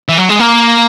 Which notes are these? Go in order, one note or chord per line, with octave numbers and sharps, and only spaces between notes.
E3
F#3
G#3
A#3